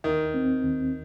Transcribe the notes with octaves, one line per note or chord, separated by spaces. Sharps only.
D#2 D#3
C4
D#2